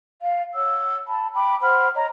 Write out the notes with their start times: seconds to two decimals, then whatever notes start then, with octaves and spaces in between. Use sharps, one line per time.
0.21 F5
0.54 C#5 F#5 E6
1.07 A5 B5
1.35 G5 B5 D6
1.62 C5 F#5 B5 F6
1.95 C#5 D#5 A#5